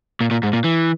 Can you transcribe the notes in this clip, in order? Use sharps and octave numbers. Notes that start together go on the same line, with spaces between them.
A#2
A#2
G#2
A#2
E3